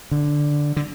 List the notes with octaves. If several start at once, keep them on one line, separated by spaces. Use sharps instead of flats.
D3
D3